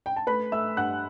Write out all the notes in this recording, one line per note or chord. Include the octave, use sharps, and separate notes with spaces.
G5
A5
A3 B4 B5
A3 E5 E6
G2 F#5 F#6